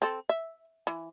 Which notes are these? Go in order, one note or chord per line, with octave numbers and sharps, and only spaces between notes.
C4 A4
E5
E3